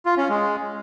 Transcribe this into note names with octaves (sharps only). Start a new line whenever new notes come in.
F4
C#4
G#3